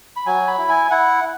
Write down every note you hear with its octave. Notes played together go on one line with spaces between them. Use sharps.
B5
F#3 G#5
B5
E4
G#5
E4 F#5